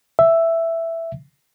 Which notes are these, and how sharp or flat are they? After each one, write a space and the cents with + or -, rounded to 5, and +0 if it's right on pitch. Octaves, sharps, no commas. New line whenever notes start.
E5 +5